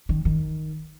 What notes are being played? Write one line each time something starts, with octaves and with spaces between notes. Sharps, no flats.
D#3
D#3